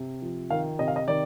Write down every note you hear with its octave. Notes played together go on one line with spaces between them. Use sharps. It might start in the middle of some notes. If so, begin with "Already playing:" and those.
Already playing: C3
F3
D#3 F5
C3 D#5
F5
D#5
D#3 D5